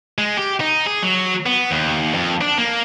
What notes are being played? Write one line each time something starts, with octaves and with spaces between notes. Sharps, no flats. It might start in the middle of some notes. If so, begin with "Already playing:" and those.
G#3
G4
D#4
G#4
F#3
B3
D#2
F2
D4
A#3